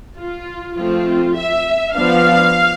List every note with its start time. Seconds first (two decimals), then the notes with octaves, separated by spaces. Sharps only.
0.18 F4
0.77 F3 A3 C4 F4
1.36 E5
1.94 F3 B3 D4 F5